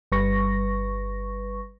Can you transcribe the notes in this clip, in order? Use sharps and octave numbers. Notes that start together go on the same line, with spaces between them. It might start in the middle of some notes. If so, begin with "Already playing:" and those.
G1 G3 B4 C#6 A#6